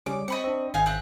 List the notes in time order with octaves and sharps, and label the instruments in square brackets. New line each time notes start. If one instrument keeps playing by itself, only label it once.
[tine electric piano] C#3 G3 C#4 [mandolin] D6
[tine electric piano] C4 [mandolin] D#5 B5 C#6
[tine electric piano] C4 D4
[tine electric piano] G#1 [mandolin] D#4 F5 G#5
[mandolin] C4 E5 F#6